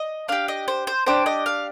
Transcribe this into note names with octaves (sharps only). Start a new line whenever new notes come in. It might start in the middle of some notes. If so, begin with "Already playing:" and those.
Already playing: D#5
D4 G4 F5
D#5
C5
C5
D4 G4 C5
D#5
F5